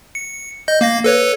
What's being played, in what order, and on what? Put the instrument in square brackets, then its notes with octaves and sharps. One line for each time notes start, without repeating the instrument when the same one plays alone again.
[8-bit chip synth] C#7
D#5 G6
A#3 F5 A#6
A4 B4 C#5